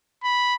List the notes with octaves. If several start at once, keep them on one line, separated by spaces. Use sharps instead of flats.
B5